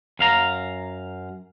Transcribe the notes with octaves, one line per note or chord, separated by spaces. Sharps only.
F#2 F5 A#5